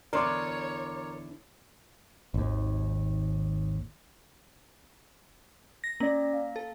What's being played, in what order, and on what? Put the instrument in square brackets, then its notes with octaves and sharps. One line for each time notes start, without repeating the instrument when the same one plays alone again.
[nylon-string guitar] E2 D3 D4 [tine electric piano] A#4 [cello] C#5 [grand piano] D5 C6 D6
[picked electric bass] G#1 D#2
[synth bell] A#6
[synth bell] A#3 [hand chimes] C#4 D5
[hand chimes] F5
[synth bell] A4